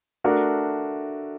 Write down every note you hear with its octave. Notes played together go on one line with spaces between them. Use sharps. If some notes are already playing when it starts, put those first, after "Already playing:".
A3 D4 F#4 A#4